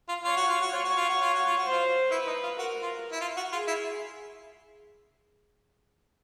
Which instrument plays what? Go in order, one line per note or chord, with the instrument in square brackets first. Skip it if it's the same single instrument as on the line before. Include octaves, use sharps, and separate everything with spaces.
[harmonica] F4
[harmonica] F4 [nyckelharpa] C#5
[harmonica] F#4
F4
F#4
[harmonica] F4 [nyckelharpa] C#5
[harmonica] F#4
F4
F#4
F4
F#4
F4
F#4
[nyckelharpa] C5
[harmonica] F4
[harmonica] E4 [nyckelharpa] B4
[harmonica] D#4
F4
[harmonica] F#4 [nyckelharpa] A#4
[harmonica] F4
E4
F4
F#4
[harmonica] F4 [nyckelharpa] G#4
[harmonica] E4